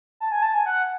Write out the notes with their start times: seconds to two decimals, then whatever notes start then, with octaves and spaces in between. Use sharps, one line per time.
0.20 A5
0.32 G#5
0.43 A5
0.54 G#5
0.66 F#5